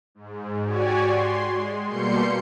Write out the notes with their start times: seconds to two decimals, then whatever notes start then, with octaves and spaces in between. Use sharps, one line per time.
0.15 G#2
0.63 F#4 G4 C#5 D5 G#5
1.01 C6
1.49 G#3
1.88 B2 G3 A#3 C6 G6 C#7